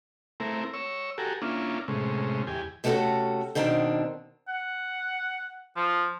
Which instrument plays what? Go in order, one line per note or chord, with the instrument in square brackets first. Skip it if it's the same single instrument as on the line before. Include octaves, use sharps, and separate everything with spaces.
[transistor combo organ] A3 C4 E4 A#4
C#5 E6
F#4 G4 A4 A#4 G#5
A#3 C#4 D4 E4 F4
A2 C3 G#3 C#4
E2 G4 G#5
[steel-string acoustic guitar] C3 A3 B3 C#4 F#4 A4
B2 D#3 C4 D4
[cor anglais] F#5
F3